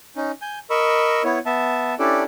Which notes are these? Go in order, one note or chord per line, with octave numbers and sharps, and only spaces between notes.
C#4 D#4
G#5 G6
A#4 D#5 B5 C#6 E6
B3 E4 C#5
B3 E5 A5
C#4 D4 E4 G4 A4 D5